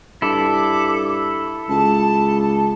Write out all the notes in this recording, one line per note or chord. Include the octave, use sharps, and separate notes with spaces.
G2 E4 A4 D6
C#2 A5